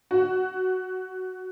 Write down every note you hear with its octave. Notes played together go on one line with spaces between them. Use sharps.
F#4